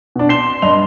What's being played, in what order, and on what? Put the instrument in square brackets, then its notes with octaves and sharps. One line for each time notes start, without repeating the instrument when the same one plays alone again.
[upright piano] B2 D4
[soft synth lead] C6 [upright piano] C7 E7 G7
[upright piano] G2 D#5 F7